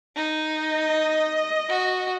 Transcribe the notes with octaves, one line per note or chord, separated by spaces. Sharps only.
D#4
D#5
F#4